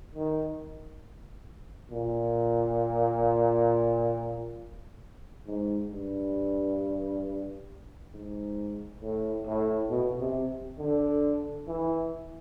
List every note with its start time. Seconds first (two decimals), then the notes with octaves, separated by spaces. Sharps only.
0.14 D#3
1.91 A#2
5.47 G#2
5.91 G2
8.13 G#2
9.01 A2
9.46 A2
9.90 B2
10.19 C3
10.78 D3
11.68 E3